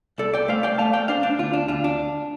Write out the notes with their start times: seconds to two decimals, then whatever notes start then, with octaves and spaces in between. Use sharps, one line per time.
0.18 C2 A4 D5
0.34 D5 G5
0.48 A3 C5 F5
0.63 D5 G5
0.78 A3 F5 A5
0.93 D5 G5
1.08 D4 C5 F5
1.23 D4
1.39 D2 F4
1.53 D4
1.68 D2 F4
1.84 D4